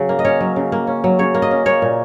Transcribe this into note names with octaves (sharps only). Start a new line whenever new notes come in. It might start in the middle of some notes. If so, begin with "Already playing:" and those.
Already playing: C#3 F#3
A#3
D#5
C#4 C#5
F#3
C#3
A#3
C#4
F#3
C#3 C#5
A#3
D#5
C#4
A#3 C#5
A#2